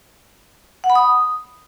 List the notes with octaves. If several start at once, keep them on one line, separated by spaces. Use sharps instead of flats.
F#5
B5
D#6